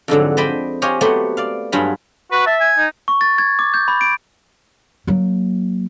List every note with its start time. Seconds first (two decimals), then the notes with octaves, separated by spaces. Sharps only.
0.08 F2 G#2 D3 F#3
0.37 C5 D5 D#5 G5 A5 B5
0.82 G4 G#4 C5 C#5 D#5 F5
1.01 F#3 A3 B3 G4 C5 F#5
1.37 D5 F5
1.72 G2 F#3 F4 G#4 B5
2.32 F#4 B4
2.46 E5 A5
2.60 G#5
2.77 D#4
3.08 C#6
3.21 A6
3.38 G#6
3.59 D6
3.74 G6
3.88 B5
4.01 D7
5.07 F#3 A#3